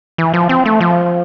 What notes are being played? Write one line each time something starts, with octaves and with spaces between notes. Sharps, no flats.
E3
F3
C4
A3
F3